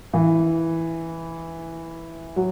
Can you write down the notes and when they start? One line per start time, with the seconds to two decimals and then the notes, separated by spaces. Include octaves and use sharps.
0.14 E3
2.36 F#3